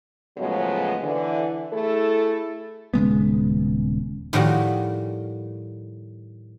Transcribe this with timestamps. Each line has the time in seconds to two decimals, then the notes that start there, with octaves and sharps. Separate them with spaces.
0.38 A2 C#3 F3 F#3 G#3 B3
1.03 D3 E3
1.72 A3 E4 G#4 A4
2.94 D#1 C#3 G#3 B3
4.33 A2 D#3 F3 G3 F#4 G4